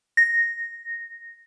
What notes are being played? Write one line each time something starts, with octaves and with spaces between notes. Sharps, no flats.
A#6